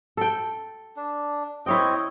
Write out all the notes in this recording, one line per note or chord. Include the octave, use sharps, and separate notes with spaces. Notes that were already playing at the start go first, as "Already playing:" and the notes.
A4 G5
D4
C4 E4 C#5 D#5 G5